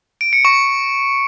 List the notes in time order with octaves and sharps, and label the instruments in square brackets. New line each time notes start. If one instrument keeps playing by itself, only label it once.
[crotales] D7
C#7
C#6